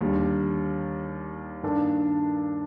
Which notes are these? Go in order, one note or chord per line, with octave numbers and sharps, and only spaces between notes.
D#2 D3 G3
G2 D#3 A#3 D4 A4